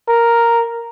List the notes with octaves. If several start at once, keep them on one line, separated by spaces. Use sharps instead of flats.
A#4